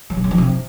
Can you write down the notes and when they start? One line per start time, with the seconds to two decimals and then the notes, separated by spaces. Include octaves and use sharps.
0.10 F#3
0.17 B2
0.24 C#3
0.31 F3
0.38 C3